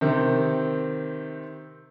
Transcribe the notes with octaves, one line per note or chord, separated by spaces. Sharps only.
C3 D#3 C4